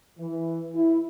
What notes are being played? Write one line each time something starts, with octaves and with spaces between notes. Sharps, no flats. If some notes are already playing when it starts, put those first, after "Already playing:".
E3
E4